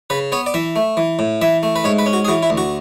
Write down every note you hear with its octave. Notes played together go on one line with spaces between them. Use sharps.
C#3 B4
B3 C#5
D5
E3 E5
A3
E3
A2
E3 E5
A3
B4
G#2 C#5
B4
C#4
F#4
G#4
E3 F#4
E4
D2
F#4